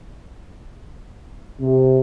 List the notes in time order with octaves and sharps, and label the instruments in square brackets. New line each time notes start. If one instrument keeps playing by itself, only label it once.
[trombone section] C3